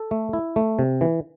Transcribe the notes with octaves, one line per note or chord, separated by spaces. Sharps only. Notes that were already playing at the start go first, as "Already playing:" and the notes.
Already playing: A4
A3
E4
A3
C3
E3